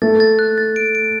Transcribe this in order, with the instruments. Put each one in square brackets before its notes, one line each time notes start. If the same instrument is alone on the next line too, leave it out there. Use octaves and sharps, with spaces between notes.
[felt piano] A3 [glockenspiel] A6
[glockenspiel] A6
F#6
A6
D7
D7